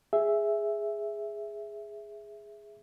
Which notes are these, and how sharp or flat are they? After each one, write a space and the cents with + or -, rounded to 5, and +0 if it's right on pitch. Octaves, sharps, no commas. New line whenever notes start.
G#4 +0 E5 +0